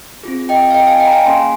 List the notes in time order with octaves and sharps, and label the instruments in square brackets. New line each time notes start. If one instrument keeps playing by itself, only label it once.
[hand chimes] C4 F4 G#4
D#5 G5
F5
D#5 G5
F5 G#5
D#5 G5
A#5
F5 G#5
A#3 C#4 G#4 G#5 C6